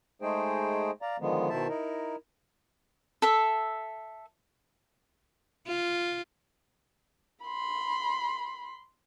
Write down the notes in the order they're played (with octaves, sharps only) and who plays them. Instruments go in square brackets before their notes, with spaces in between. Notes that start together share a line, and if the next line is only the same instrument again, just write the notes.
[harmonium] G#3 A3 D#4 G#4 C5 G5
D5 F5 A#5
D3 D#3 F3 G#3 B3
B2 D#3 E4 C5 E5 A5
D#4 E4 A#4
[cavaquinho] A4 E5
[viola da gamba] F4
[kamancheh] B5 C6